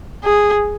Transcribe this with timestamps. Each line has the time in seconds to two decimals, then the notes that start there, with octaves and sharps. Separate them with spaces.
0.24 G#4